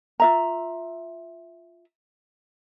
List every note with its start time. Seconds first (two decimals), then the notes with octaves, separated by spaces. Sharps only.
0.20 F4 E5 A#5